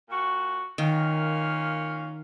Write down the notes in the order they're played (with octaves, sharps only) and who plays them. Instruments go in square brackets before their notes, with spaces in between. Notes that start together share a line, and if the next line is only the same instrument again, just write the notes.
[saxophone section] A#2 F#4
[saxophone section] A#2 C#4 F5 [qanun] D#3